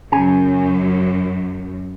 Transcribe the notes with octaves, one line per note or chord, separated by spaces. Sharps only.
F#2 C#3 G#5